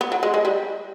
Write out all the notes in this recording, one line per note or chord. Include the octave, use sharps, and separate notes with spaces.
B3
F#3
G#3
G#3
G3